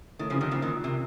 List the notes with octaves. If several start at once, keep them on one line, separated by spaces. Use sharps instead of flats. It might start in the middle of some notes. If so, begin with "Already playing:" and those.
A2 D#3
C#3 F3
C3
D#3 F#3
A#2 C#3 F3
D#3 F#3
C3